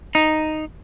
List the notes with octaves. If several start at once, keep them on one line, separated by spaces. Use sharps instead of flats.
D#4